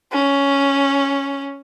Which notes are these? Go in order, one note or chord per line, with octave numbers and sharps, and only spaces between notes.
C#4